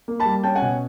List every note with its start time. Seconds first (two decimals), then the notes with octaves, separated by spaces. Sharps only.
0.08 A#3
0.20 A5 B5
0.25 G3
0.44 C#4 G5 A5
0.55 F#5 G#5
0.62 B2